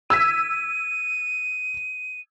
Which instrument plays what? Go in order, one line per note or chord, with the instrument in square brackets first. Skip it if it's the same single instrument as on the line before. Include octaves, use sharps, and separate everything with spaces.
[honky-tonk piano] E6 G#6 B6 [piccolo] D#7